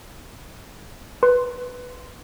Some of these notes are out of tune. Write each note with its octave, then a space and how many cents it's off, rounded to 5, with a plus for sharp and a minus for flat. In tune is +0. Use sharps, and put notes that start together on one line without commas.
B4 +0 C6 +0